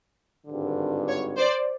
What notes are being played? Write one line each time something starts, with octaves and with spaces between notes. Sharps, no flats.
G#1 G2 D3
C#5
C5 D5